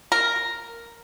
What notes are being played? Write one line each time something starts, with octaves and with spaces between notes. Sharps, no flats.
A#4